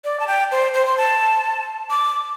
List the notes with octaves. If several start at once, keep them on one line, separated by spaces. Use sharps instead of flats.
D5
A5
G5
C5
C5
C6
A5
D6